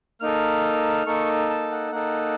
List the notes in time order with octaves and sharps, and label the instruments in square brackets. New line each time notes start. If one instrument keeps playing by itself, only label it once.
[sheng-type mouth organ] A#3 D#4 A4 F6
A#3 D#4 A4 C#6
A5
F#5
A#3 D#4 A4 F#5